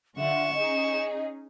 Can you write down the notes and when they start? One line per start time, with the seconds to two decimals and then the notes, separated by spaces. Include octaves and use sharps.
0.18 D3 F4 E5 F#5 C#6 E7
0.54 C#4 D#4 G#4 D#5